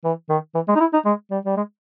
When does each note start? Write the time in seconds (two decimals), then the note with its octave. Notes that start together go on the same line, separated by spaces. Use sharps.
0.05 E3
0.30 D#3
0.55 E3
0.68 G#3
0.76 D#4
0.80 E4
0.94 D#4
1.05 G#3
1.31 G3
1.46 G3
1.57 G#3